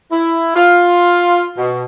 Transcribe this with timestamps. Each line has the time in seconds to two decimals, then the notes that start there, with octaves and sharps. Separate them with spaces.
0.11 E4
0.55 F4
1.57 B2